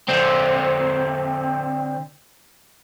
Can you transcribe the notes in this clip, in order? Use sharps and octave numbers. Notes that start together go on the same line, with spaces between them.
D3 C4